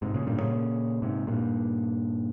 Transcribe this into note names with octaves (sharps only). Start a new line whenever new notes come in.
G#2 C3
A#2 C#3
G2 A#2
A#2 C#3
G#2 C3
G2 A#2